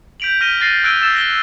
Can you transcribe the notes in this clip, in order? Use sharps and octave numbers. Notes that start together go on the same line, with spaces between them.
G6 B6 D7 F7 F#7
F6 A#6 B6 D#7 G7
F#6 A6 A#6 C7 D#7
E6 F#6 G#6 D7 D#7 G7
E6 A6 E7
A#6 D7 G7